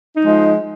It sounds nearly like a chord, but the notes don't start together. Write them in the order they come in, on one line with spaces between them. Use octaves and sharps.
D#4 F3 G#3